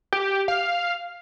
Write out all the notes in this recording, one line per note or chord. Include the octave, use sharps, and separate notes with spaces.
G4
F5